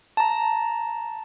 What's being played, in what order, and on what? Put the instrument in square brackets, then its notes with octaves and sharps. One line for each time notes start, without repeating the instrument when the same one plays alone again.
[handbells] A5 A#5